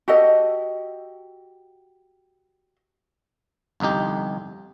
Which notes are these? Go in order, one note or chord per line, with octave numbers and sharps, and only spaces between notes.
F#4 G4 A4 D#5
G1 C2 F2 D#4 G4